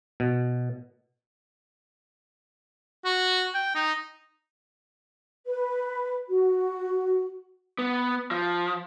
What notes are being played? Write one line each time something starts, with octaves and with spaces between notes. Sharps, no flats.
B2
F#4
G5
D#4
B4
F#4
B3
F3